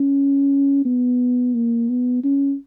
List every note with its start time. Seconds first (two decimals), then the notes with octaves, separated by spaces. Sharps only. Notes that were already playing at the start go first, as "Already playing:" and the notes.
Already playing: C#4
0.85 B3
1.54 A#3
1.89 B3
2.24 C#4